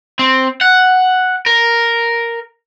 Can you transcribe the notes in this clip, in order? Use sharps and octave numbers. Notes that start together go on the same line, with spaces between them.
C4
F#5
A#4